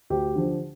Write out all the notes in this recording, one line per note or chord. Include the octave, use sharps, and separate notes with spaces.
D2 G4
D3 F3